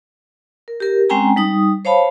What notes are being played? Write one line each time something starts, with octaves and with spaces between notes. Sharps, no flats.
A#4
G4 A#4
G#3 C4 C#4 G5 G#5 A#5
G3 D#4 D#6
C5 C#5 F5 A5 B5